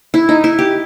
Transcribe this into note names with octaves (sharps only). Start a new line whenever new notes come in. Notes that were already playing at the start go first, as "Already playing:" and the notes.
E4
D#4
E4
G4